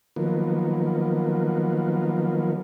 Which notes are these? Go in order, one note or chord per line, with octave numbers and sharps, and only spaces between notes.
D#3 F3 F#3 A#3 B3